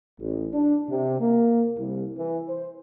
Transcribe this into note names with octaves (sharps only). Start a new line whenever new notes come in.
A1
D4
C3
A#3
C2
E3
C5